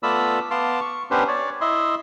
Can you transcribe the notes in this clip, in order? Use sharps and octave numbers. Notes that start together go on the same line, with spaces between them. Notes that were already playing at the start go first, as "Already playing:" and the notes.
A3 B3 F4 D5 B5 E6
B3 F5 A5 C6 D6
C#6
B3 C#4 D4 G4 B4 C5
C#5 D5
E4 D#5 E5 C6